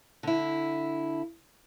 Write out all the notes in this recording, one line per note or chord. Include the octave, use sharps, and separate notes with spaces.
D3 E4